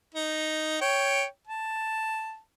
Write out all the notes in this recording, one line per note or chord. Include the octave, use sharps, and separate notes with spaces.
D#4
C#5 G5
A5